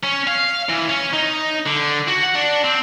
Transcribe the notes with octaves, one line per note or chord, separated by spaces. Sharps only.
C#4
F5
E3
C#4
D#4
D3
F#4
F#5
D4
C4